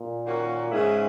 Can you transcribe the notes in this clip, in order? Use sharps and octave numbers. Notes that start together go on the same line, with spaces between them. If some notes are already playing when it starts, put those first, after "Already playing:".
Already playing: A#2
D#3 A#3 C#4 F#4
G#2 C#3 G#3 C#4 E4 G#4